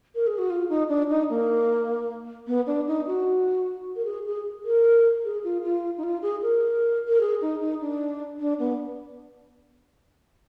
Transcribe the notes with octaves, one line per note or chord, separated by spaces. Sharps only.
A#4
G#4
F#4
F4
D#4
D4
D#4
A#3
B3
D4
D#4
F#4
A#4
G#4
G#4
A#4
G#4
F4
F4
D#4
F4
G#4
A#4
A#4
G#4
D#4
D#4
D4
D4
B3